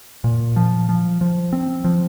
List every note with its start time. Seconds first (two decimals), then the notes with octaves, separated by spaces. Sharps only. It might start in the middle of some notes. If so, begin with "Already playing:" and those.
0.24 A#2
0.56 F3
0.89 F3
1.21 F3
1.53 C4
1.84 F3